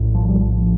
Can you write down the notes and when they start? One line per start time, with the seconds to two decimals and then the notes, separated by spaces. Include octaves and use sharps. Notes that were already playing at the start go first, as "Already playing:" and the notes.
Already playing: A#1 A2
0.14 F3
0.28 G3
0.41 F3